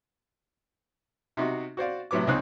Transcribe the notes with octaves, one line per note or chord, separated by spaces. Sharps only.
C3 D#4 F#4
F#4 C5 D5 F5
A2 C3 F#3 B3 D6
C#2 C#3 C4 D#4 C5 F#6